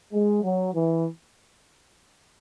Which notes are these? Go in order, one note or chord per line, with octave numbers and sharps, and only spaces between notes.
G#3
F#3
E3